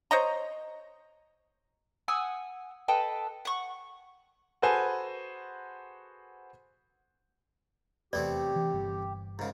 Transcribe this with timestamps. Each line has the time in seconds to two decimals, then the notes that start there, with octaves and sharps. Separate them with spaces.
0.11 C5 C#5 D#5 A#5
2.08 F#5 G#5 D#6 E6
2.88 A4 B4 D#5 G5
3.45 F#5 C#6
4.62 F#4 G#4 A4 B4 C5 G#5
8.13 F1 E2 C3 A3 B3 G4 D5
8.55 E3 D4
8.74 G1 G2 E3
9.39 G#2 C#3 A#4